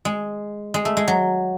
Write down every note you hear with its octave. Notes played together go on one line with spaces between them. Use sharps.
G#3
G#3
A3
G#3
F#3